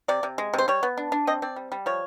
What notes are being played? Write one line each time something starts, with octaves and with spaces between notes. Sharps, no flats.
C3 D5
C3
G#3
C3 C5
G3 C#5
B3
D4
D4
C4 D#5
C4 D5
G3
G3
F3 C#5